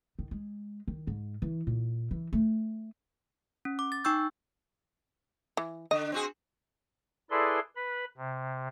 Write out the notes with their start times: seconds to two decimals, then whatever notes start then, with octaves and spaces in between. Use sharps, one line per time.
0.19 D#3
0.31 G#3
0.87 D#3
1.07 G#2
1.42 E3
1.67 A#2
2.11 E3
2.33 A3
3.65 C#4
3.79 D6
3.92 A6
4.04 D#4 G5 C#6 E6 G6
5.57 E3
5.91 D3 D#5
6.12 C4 F#4 G#4
7.30 E4 G#4 A4 B4 D5 C6
7.76 B4 B5
8.17 C3